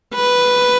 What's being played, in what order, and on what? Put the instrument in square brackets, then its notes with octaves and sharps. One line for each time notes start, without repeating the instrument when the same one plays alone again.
[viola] B4